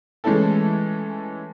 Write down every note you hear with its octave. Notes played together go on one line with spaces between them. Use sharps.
E3 G#3 A3 C#4 E4 A4